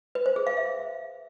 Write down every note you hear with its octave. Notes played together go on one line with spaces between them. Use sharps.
B4
C5
G#4
F5
E5